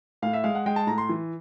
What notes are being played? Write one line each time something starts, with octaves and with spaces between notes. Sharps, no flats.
A2 F5
E5
G#3 F5
F#5
G#3 G5
A5
A2 A#5
C6
E3